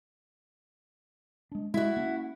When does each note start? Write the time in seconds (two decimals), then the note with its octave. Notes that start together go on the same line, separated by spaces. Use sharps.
1.52 G#3 D4
1.74 G#3 E4 F#4
1.97 A#3 C#4